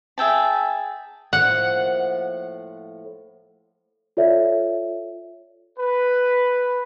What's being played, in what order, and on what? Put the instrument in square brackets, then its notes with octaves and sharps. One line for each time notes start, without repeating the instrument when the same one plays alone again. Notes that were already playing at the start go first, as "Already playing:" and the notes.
[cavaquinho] G#4 E5 G5 A5
[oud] A2 F3 A#3 [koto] F#5
[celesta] F4 A4 C#5 D5 E5
[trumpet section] B4